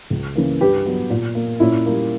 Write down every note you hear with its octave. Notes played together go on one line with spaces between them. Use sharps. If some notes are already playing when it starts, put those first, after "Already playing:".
C#2
C#3 E3 A#3
G2 G4 B4
F#3 B3
A#2
A#3
A#2 C#4 E4
G3 A#3